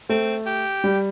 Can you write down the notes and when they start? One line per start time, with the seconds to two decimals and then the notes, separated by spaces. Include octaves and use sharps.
0.09 A3 C4
0.46 G4
0.84 G3